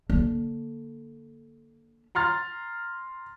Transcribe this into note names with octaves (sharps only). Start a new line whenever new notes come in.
D3 A#3
A#5 C6 F6 A6